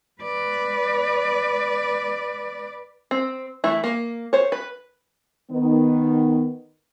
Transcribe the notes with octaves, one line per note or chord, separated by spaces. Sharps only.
B4 D5
C4
E3 A3 E4
A#3
C5 C#5
B4
D#3 B3